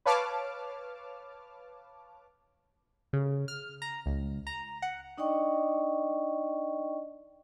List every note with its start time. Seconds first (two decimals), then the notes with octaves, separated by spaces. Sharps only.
0.06 B4 C#5 F5 A5 D6 F6
3.13 C#3
3.48 F6
3.82 A#5
4.06 C#2
4.47 A#5
4.82 F#5
5.17 D4 D#4 D5 D#5 G5 C#6